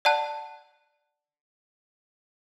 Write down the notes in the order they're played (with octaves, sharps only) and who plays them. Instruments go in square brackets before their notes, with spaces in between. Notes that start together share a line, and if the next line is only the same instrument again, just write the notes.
[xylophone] D5 F#5 A5 F#6